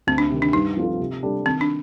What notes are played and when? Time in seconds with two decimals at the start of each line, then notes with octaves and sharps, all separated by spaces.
0.07 D2 C4
0.18 D4
0.30 C3 D#3
0.42 D4
0.53 G2 D#4
0.77 F3 C4 F4 A4
1.00 C3
1.23 G3 D4 A4
1.46 D#3 C4
1.61 D4